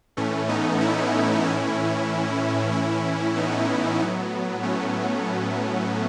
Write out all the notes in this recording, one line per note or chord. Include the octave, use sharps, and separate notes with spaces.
A2 E3 A3 C#4
B3 D#4
C#4 E4
A2 E3 C#4 E4
A2 E3 C#4 E4
B3 D#4
A2 F#3 B3
A3 C#4